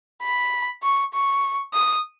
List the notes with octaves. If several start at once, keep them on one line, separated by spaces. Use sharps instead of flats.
B5
C#6
C#6
D#6